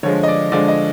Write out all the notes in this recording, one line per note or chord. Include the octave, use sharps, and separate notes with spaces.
D3 F3 G#3 C#5
D#5
D5
D3 F3 G#3 D5
D#5